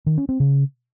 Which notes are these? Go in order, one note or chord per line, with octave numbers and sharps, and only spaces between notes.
D#3
C#4
C4
C#3